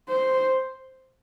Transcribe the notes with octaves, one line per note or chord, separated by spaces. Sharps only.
C5